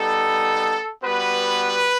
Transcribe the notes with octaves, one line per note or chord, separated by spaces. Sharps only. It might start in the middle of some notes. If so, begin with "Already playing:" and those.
Already playing: G3 B3 D#4 A4
G3 B3 F#4 B4